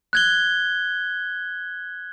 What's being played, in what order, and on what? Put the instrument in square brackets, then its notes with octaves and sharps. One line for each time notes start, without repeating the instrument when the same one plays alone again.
[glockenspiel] F#6 G#6 G7